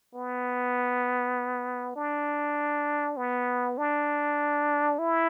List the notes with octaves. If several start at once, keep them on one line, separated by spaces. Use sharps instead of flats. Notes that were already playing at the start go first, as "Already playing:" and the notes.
B3
D4
B3
D4
E4